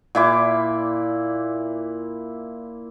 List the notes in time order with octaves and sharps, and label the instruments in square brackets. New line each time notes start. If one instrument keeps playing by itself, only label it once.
[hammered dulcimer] A#2 E4 D6